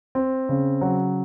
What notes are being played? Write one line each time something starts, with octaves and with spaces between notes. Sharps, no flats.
C4
C#3
F#3